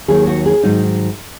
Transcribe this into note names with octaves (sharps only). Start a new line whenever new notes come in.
D#2 D#3 F#3 G#4
F#4
G#4
G#2 D#3 F#3 D#4